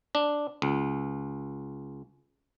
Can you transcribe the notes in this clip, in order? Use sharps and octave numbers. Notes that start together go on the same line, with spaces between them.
D4
C#2